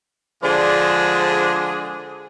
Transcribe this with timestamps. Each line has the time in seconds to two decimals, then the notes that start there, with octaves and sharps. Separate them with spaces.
0.43 D3 F3 G#3 D4 G#4 C5